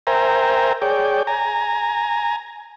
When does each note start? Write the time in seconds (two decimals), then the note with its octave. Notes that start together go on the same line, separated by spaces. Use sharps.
0.07 A#4 C5 E5 G5 G#5 A#5
0.82 G#4 C#5 D5 G5
1.27 G#5 A#5